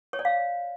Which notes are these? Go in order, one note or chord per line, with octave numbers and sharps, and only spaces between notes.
C#5
D5
F5